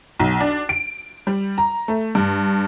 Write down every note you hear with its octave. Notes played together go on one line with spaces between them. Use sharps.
B1
D4
D7
G3
A#5
A3
G2